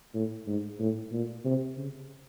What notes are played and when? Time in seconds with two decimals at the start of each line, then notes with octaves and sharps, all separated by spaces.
0.14 A2
0.47 G#2
0.79 A2
1.12 A#2
1.45 C3
1.78 C#3